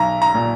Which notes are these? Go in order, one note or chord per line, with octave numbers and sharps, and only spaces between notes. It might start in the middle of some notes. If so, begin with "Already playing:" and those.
Already playing: B1 A#5
A#5
A#2